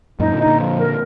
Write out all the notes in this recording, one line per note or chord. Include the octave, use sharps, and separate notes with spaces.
F#2 A#2 D#4
A#2 D3
D#4
A#2 D3
F3
A#4